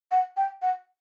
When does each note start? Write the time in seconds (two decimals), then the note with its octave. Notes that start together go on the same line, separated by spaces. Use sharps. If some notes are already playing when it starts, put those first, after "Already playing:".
0.12 F#5
0.37 G5
0.62 F#5